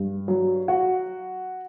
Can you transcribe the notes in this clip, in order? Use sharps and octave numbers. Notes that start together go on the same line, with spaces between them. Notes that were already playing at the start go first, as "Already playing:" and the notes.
Already playing: G2
F#3
F#4